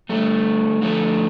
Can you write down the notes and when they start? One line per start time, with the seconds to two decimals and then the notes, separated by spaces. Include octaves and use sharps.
0.09 D3 G3 A3
0.82 D3 F3 A3